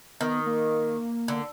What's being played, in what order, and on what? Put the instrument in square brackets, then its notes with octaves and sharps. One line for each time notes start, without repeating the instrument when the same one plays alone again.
[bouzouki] D#3 [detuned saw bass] B3
[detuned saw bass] A#3
[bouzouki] D3